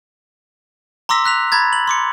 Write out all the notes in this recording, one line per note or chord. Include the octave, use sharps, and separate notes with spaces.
A#5 C6 D6 E6 A#6 B6
F#6 B6 F7
A#5 B5 G#6 A6
F#7
C6 D6 C#7